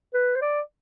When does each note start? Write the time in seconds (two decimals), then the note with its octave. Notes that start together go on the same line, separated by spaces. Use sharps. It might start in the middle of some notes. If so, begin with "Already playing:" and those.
0.14 B4
0.35 C5
0.41 D5